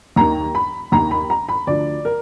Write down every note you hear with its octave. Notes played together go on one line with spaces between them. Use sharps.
D#2 D#3 A#5
B5
D#2 D#3 A#5
B5
A#5
B5
D2 D3 F3 D5
A#4